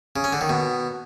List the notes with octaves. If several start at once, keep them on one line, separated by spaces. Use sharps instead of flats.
C#3
C#4
D3
D#3
B2